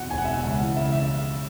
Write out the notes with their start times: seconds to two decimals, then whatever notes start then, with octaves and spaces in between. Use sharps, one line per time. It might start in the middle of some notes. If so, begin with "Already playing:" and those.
Already playing: E2 B2 F#5
0.10 E1 G#5
0.18 F#5
0.25 E5
0.28 E2
0.33 F#5
0.44 C#2
0.60 E3
0.76 C#3 E5
0.92 E5